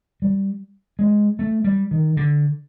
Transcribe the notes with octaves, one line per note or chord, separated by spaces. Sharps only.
G3
G#3
A3
G3
D#3
D3